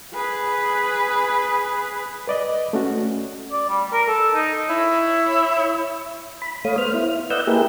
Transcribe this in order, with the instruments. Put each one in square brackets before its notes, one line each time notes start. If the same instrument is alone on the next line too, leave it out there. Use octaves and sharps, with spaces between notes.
[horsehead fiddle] G#4 B4
[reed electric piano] B4 D5 D#5
A3 C#4 F#4
[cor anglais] D5
G3
A#4
A4
D#4
[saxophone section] E4 C#5
[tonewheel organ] B5
A3 C#5 F5 D#6
B3 C5 F6
E4
B4 D5 D#5 F#5 E6 G6
A#3 E4 G4 G#4 A#4 B4